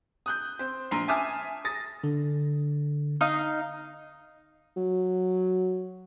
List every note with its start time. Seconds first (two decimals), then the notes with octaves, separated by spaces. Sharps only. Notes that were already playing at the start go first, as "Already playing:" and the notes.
0.26 D#6 F#6 G6
0.59 C4 C5
0.91 A#1 A#5 C6 C7
1.08 E5 G#5 A5 D6 D#6 F6
1.65 D#6 A6 A#6
2.04 D3
3.21 D#4 D#5 F5
4.76 F#3